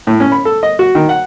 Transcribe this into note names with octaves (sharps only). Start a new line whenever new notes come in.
A2
C#4
B5
A4
D#5
F#4
D#3
F#5